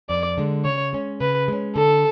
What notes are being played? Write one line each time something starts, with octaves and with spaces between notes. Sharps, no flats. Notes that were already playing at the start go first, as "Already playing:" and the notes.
F2 D5
D3 G#3
C#3 C#5
G#3 C#4
C#3 B4
G#3 C#4
D3 A4